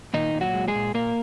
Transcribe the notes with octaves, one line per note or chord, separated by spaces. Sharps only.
A#2 D#3 D#4
A#2
F#3 F#4
G#3
G#3 G#4
A#2
A#2 A#3 A#4